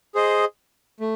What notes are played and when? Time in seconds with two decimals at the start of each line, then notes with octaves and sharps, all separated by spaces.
0.15 G#4 C5 D#5
1.00 A3